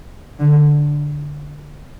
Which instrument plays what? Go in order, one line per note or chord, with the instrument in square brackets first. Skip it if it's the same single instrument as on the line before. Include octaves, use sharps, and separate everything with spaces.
[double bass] D3